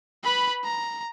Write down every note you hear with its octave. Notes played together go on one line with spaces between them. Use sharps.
B4 B5
A#5